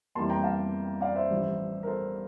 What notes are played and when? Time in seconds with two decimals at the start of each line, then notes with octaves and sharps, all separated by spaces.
0.15 F2 E3 G3 A#3 A5 C6
0.30 G5 A#5
0.44 F5 A5
1.01 D5 F5
1.15 C5 E5
1.30 A1 G2 F3
1.83 A#4
1.87 A4 C5